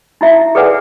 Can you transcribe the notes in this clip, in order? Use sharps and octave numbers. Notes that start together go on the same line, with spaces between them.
D#4 E4 E5
G#4 A4 B4 D5 F#5 G#5